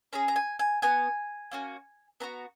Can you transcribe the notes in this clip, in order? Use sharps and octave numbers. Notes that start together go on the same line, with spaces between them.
C#4 G#4 A#5
A#5
G#5
G#5
B3 F#4 G#5
A#3 C#4 F#4
B3 F#4 A#5